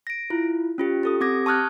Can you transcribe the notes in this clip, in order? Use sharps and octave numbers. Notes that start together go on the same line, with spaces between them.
A#6 D7
E4 F4
C#4 F4 G4
G4 A4 D#6
C4 G4 D6 G#6 A#6
A5 C#6 D#6 F6 F#6 G#6